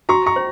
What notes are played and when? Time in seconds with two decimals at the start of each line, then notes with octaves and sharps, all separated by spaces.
0.09 F#4 A#5 C#6
0.26 A#5 C#6
0.36 C5